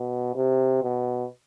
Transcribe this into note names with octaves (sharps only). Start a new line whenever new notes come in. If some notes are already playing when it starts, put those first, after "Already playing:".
Already playing: B2
C3
B2